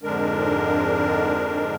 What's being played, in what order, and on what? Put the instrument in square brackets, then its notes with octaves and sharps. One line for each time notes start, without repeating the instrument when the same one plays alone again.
[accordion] F2 G#2 D3 G#3 D4 A#4